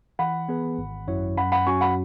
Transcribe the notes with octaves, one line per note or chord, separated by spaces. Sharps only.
E3 F#5 B5
B3 G#4 B4
G#1
F#2 F#3 E4 C#5
F#2 F#5 B5
F#5 B5
F#3 C#4 F#4 G#5 C#6
F#5 B5